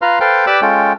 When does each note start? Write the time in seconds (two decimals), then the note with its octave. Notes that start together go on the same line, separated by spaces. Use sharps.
0.02 F4 B4 F5 A#5 C6
0.20 A4 B4 C5 F5 G5 C6
0.47 G4 B4 D5 B5 D6 E6
0.62 G#3 C#4 F4 A4 G5